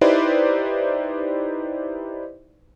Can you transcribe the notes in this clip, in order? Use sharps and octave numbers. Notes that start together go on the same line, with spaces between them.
D#4 E4 G4 B4 C5 D5